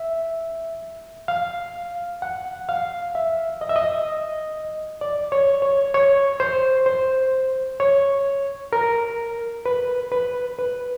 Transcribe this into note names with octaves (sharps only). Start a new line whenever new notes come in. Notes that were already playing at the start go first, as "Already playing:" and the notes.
Already playing: E5
F5
F#5
F5
E5
D#5
E5
D#5
D5
C#5
C#5
C#5
C5
C5
C#5
A#4
B4
B4
B4